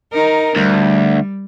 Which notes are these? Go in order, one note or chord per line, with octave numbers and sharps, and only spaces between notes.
D#4 A#4
D2 G3